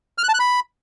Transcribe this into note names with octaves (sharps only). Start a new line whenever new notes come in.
F6
F#6
A5
F#6
B5